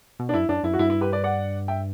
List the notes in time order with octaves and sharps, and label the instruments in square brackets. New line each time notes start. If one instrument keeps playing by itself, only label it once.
[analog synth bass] B2
[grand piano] D4
[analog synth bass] F#2 [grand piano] E4
[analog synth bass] F#2 [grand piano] D4
[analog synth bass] F#2 [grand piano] E4
[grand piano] F#4
[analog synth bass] G2 [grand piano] E4
[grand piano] E4
G4 B4
B4 D5
D5 F#5
E5 G5